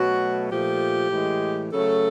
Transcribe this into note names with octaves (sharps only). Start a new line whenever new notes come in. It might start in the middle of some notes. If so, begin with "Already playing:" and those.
Already playing: B2 F#3 A3 F#4
A#2 F3 A3 G4
A2 E3 G#3
C#3 F#3 A3 A4